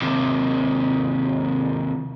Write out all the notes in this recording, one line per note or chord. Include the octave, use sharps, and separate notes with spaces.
D#2 C3